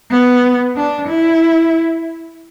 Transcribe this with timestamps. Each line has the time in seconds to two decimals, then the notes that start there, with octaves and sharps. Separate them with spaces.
0.10 B3
0.77 D4
1.08 E4